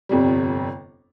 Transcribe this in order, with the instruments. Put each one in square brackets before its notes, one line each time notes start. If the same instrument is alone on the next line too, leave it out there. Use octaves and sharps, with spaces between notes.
[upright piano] G1 F2 C3 G3